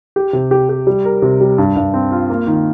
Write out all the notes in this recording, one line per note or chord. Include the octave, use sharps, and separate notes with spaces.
G4
C3
G4
G4
G3
A#4
C3
G3
G2
G2
C4
F4
A#3
D#3